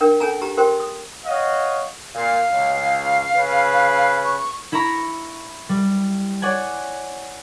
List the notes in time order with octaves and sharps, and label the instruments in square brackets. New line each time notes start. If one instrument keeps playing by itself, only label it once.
[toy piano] D4 A#4 G5
C#4 A4 G#5 A#5
G4 A#5
G4 A#4 C5 G5 C6
D#6
[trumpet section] C#5 D#5 F5 F#5
[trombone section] A#2 [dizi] F5
[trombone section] C#2
C#3 B4
[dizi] C#6
[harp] E4 E5 A#5 B5 C#6
G3
C#5 D5 F#5 G#5